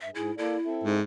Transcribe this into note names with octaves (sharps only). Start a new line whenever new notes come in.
G2 E5
G#2 E4 G#4
A#3 E4 A4 D5
C4 A4 E5
G#2